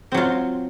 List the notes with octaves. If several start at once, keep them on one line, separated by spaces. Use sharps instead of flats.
F#3 C4 F4